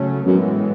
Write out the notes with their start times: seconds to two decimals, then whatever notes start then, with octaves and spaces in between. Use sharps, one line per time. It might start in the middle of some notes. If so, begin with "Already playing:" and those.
Already playing: C#3 F#3 A3 C#4
0.25 F#2 A2 E3 G#3 B3